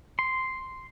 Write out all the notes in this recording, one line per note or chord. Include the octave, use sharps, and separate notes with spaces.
C6